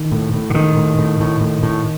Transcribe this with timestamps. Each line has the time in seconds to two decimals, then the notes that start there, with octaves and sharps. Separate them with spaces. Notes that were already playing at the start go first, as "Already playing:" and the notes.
Already playing: D#3
0.12 A2
0.33 A2
0.50 D3
0.55 A2 D#3
0.77 A2
0.99 A2
1.20 A2
1.41 A2
1.63 A2